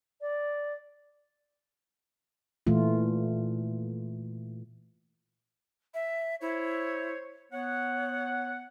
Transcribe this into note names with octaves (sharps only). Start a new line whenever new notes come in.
D5
A#2 E3 A3 F4
E5
E4 C5 C#5
B3 C#5 F#5